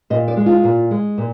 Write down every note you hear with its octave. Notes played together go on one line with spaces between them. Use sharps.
A#2 D#5
D5
G#3
F4
A#2
G#3
A#2